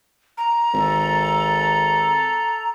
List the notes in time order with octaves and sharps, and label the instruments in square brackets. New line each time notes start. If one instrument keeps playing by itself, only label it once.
[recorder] A#5
[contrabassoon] G#1 [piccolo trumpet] A4